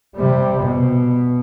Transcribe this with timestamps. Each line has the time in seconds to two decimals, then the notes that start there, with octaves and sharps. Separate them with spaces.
0.16 C3 G3
0.62 B2